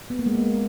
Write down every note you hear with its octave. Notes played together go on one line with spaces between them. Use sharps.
B3
A#3
G#3
A#3